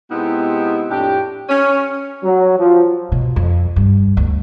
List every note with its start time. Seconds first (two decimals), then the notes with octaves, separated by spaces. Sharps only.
0.11 C3 G#3 B3 D#4 E4 G4
0.91 F2 A2 D4 G4
1.49 C#4
2.24 F#3
2.58 F3
3.12 B2
3.36 F2
3.76 G2
4.17 D2